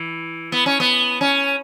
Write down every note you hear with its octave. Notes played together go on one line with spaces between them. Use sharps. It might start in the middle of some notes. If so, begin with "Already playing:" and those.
Already playing: E3
B3
C#4
B3
C#4